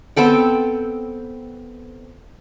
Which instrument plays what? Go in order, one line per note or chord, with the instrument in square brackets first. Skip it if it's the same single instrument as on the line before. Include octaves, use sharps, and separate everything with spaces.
[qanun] B3 C4 A4 G5